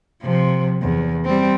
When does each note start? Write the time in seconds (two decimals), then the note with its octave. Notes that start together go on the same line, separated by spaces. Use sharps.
0.22 C3 F3
0.82 E2
1.25 G3 C4